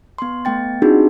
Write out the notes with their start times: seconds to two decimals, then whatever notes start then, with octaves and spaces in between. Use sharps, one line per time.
0.18 B3 C6
0.45 A3 B3 G5 A6
0.82 C4 D4 D#4 F4 F#4 G#4